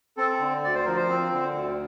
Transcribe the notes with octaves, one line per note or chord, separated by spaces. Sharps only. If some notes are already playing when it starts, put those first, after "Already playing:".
C4 A4
D3
D2 D5
C5
F3 A#4
C5
C4
D3
D2